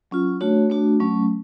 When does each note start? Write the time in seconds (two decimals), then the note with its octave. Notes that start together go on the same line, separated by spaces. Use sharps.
0.11 F#3 C#4 F4
0.41 A3 D4 F#4 C#5
0.70 A3 D4 F#4
1.00 F#3 A3 C#4